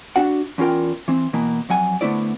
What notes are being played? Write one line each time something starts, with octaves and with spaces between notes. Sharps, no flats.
D4 F#4 F#5
E2 C#4 F4 A#4 G5
E3 C4
B2 E3 A#3
F2 F#3 F#5 G#5
D3 A3 B3 E4 C5 D5